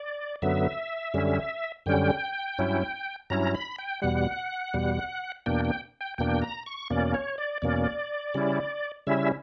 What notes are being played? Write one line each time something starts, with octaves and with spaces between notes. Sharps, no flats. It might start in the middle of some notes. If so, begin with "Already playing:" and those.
Already playing: D5
F#2 D3 F#3 B3 E5
F#2 D3 G3 C#4
F#2 D3 G3 C#4 G5
G2 F#3 C#4 E4
G2 F#3 C#4 E4 A#5
B5
G5
E2 B2 G3 F#5
E2 B2 G3
E2 B2 A#3 D4 G5
G5
G5
E2 B2 A#3 D4 G5
A#5
C#6
E2 B2 A#3 C#4 D5
C#5
D5
E2 B2 A#3 C#4 D5
C#3 G3 C#4 E4
C#3 G3 C#4 E4 E5